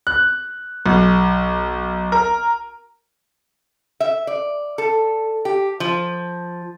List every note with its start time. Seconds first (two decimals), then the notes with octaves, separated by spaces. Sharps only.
0.07 F#6
0.86 B1
2.12 A#4
4.00 E5
4.27 D5
4.78 A4
5.45 G4
5.80 F3